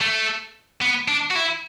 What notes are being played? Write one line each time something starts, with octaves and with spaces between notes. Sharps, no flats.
A3
B3
D4
F#4
E4